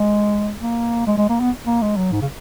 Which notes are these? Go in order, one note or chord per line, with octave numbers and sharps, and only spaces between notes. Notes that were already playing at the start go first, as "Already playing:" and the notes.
Already playing: G#3
A#3
G#3
G#3
A#3
B3
A#3
G#3
F#3
G#2
C#3